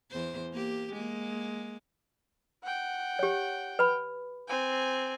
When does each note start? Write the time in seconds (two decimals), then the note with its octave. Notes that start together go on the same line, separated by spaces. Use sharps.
0.11 E2 C5
0.53 A#3 G4
0.94 G#3 A#3
2.64 F#5 G5
3.19 G4 C#5
3.79 B4 B5
4.48 C4 G#5